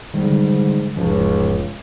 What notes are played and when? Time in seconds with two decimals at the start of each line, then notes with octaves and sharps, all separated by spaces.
0.14 G#2 D3 D#3 G3
0.96 E1 C#2 G#2 F3